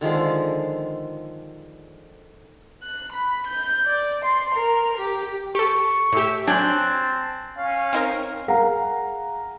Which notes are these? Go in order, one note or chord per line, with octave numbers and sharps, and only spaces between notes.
D3 D#3 F3 G#3
F#6
B5
G6
D5
C6
A#4
G4
G4 A4 C#6
A2 G4 E5
F#3 C4 D4 G#5 A5 F#6 G6
C#4 F5
C4 D#4 A#4
G#4 A#4 F5 F#5 A#5